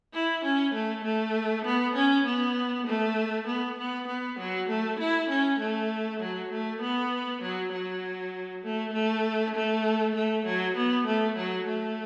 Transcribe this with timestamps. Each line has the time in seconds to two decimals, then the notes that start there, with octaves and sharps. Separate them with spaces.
0.13 E4
0.44 C#4
0.74 A3
1.04 A3
1.65 B3
1.96 C#4
2.26 B3
2.87 A3
3.47 B3
3.78 B3
4.08 B3
4.39 F#3
4.69 A3
4.99 E4
5.30 C#4
5.59 A3
6.20 F#3
6.52 A3
6.82 B3
7.42 F#3
7.72 F#3
8.64 A3
8.93 A3
9.55 A3
10.15 A3
10.46 F#3
10.77 B3
11.06 A3
11.37 F#3
11.67 A3